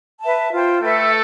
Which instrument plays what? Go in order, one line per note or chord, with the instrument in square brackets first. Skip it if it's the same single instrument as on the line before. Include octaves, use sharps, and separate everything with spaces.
[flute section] B4 E5 A5
F4 C5 G5
[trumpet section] A3 A4 [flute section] B4 E5 G5